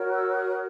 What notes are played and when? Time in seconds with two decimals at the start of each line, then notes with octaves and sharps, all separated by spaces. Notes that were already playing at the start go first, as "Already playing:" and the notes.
Already playing: F#4 A#4 C#5
0.14 E6
0.35 D#6